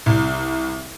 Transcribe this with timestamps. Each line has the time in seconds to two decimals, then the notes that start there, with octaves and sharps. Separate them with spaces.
0.06 C2